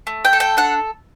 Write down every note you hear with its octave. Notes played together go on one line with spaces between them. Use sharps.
A3
G5
A4
G5
D4 F#5